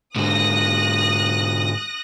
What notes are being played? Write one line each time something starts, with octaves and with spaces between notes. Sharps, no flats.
G#2 D3 D#6 F#6 A#6